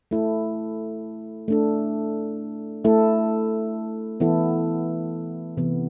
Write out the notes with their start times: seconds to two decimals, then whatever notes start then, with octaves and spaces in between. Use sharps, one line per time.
0.11 A3 E4 A4
1.48 A3 D4 A4
2.84 A3 E4 A4
4.20 E3 B3 E4 A4
5.57 C3 E3 B3